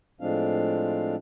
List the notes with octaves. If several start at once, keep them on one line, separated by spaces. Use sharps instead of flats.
A2 F3 G#3 C4 D4 F5